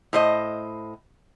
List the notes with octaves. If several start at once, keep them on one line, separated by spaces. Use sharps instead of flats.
A2 C5 D#5